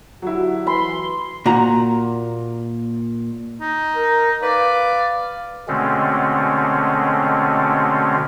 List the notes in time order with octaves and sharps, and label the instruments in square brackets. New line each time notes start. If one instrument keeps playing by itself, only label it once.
[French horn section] D3 F#4 G4 [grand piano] F#3 E4
[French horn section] E3 [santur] B5 [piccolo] C6
[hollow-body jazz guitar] A#2 F#4 A#5
[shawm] D#4
[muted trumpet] A#4
[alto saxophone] B4 [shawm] D5 [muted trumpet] F5
[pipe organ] B2 D3 G#3 A3 C4 C#4